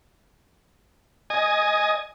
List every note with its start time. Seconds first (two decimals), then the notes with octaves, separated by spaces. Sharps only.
1.30 D#5 G#5